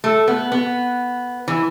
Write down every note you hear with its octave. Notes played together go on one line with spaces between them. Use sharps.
A3
B3
B3
E3